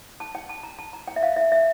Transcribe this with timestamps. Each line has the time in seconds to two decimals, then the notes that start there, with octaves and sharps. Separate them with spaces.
0.20 A5
0.35 G5
0.49 A5
0.63 A#5
0.79 A5
0.93 A#5
1.08 G5
1.16 E5
1.23 F5
1.36 E5
1.52 E5